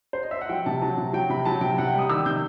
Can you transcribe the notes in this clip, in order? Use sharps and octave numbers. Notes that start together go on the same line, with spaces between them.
C5
D#5
E5
F#5
F#3 G5
C3 A5
F#3 A5
C3
F#3 G5
C3 B5
F#3 A5
C3 G5
C3 F#5
G5
G3 D#6
D#3 E6
C3 G6